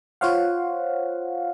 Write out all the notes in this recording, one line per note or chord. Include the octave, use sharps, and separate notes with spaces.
F4 C5 C#5 F5 F#5